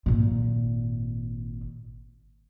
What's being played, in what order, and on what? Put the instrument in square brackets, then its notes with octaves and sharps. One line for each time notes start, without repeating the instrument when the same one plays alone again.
[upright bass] G#1 A#2